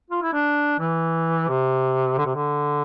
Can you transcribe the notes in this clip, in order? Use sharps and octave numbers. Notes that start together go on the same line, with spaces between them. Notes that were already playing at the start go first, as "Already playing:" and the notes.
F4
E4
D4
E3
C3
D3
C3
D3